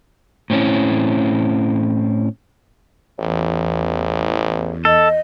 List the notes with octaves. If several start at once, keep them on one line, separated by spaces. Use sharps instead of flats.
A2 C4 C#4 E4
A1 E2
A4 D#5